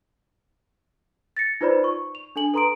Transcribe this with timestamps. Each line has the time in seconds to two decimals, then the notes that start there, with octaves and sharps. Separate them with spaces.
1.37 A6 A#6 C#7
1.61 D#4 F4 B4 C5 D5 B5
1.84 C#6
2.15 F7
2.36 D4 A4 G#5 F#7
2.54 A4 B4 A#5 C6 D#6 D7